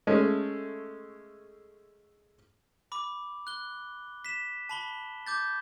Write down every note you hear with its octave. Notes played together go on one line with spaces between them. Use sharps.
G#3 A3 C#4
B5 D6
F#6 G7
B6 E7
A5 B5 G7
D6 G6 A6